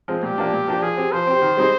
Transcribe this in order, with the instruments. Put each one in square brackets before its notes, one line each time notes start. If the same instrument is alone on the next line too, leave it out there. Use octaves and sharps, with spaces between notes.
[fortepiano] F3 G#3 C4
[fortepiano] A#2 [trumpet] G4
[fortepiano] F3 A#3 D4
A#2
F3 A#3 D4
[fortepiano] F3 [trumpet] G#4
[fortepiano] C4 G4
[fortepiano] F3 [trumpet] C5
[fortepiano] C4 G4
D#3
G3 C4 D#4 G#4